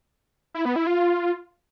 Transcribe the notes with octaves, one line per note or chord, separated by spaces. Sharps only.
E4
B3
E4
F4